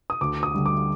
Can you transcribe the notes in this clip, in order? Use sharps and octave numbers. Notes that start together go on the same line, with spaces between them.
D#6
D2 D6
D#6
D3 G3
D6